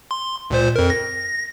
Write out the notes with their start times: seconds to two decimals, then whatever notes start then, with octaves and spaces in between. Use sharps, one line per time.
0.11 C6
0.50 C#2 A#2 C5
0.76 F2 A#4
0.90 A#6